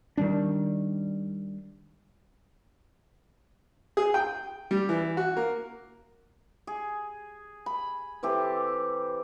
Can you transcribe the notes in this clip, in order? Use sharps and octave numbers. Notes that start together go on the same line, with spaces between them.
D#3 G3 D4
G#4
G5
G3
E3
F#4
A#3
G#4
B5
E3 C4 G4 A4